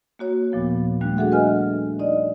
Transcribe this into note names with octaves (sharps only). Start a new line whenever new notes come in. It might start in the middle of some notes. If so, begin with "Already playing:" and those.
A#3 F#4 C#5
D#2 A#2 F3 B3
G3 A3 D4 F#6
D4 F#4 G#4 A4 E5 F#5
B4 D#5 G#5 F6
D#4 D5 D#5